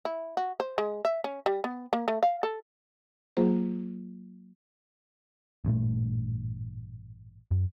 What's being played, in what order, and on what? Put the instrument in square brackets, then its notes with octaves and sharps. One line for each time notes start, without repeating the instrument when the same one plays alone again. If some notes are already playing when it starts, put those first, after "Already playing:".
[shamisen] E4
F#4
C5
G#3
E5
C#4
G3
B3
A#3
A3
F5
A4
[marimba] F#3 A#3 F4 G#4 C5
[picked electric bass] A1 G2 A#2 A3
F#2